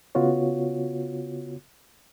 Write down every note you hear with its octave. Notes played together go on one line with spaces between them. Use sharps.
C#3 B3 F4 F#4 C#5